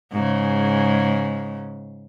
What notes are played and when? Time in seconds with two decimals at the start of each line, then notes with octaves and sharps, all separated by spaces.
0.12 G#2 C#3